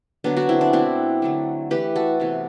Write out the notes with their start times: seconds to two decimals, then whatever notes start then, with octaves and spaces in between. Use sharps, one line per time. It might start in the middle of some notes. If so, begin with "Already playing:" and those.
0.24 D3 F#3 B3 D4
0.36 D4 F#4
0.49 C4 E4
0.61 D4
0.73 B2 A3 C4 E4
1.22 D3 F#3 A3
1.71 E3 A3 G4 B4
1.96 F#4 A4
2.20 C3 E3 B3